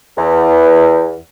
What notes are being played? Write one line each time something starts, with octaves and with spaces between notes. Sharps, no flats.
E2